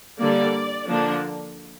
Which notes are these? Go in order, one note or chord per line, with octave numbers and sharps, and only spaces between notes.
D3 G3 A#3 D5
D3 F3 A#3 D4